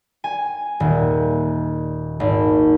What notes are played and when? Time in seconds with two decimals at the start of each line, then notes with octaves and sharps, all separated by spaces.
0.24 G#5
0.80 D#1
2.20 G#1